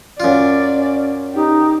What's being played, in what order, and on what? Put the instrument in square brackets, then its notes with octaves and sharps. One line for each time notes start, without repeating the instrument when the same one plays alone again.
[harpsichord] F#2 F4 [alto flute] C#4 [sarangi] D5
[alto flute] C#4
[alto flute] D#4 [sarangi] G4